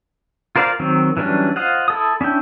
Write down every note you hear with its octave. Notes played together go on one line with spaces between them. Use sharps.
F4 A#4 C5 D5 F5
D#3 F#3 C4
E3 F#3 G3 C#4 D4
F4 C5 D#5 F5 F#5
E4 A4 D#6
C#4 D4 E4 G5